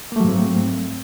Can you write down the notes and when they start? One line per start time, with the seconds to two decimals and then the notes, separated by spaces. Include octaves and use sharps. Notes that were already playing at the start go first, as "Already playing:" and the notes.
0.12 A#3
0.16 A3
0.20 F#3
0.24 G#2
0.29 C4